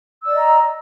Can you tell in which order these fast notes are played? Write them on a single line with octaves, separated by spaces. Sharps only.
E6 D5 D#5 A#5